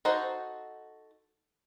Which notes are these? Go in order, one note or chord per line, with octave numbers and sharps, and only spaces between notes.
D#4 F#4 A4 C5